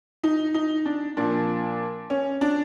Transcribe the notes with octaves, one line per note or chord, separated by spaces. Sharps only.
D#4
D#4
D4
A#2 F3 D4
C#4
D4